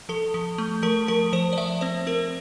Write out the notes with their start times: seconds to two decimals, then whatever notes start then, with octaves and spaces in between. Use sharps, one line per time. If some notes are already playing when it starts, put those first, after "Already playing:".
0.09 F3 A4
0.34 F3
0.58 A3
0.83 F3 A#4
1.08 F3 A#4
1.33 F3 C5
1.53 D5
1.58 F3 E5
1.81 C4 C5
2.07 C4 A#4